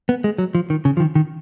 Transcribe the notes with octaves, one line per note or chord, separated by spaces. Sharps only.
B3
G#3
F#3
F3
D#3
C#3
F3
D#3
D#3